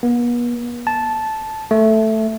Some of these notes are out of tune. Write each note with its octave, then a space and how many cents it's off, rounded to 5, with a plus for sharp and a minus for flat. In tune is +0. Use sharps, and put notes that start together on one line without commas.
B3 -45
A5 -10
A3 +0